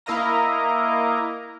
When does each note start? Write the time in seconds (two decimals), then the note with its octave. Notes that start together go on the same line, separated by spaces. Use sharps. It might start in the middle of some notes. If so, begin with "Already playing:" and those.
0.06 A#3 E4 A#4 D#5 F5 A#5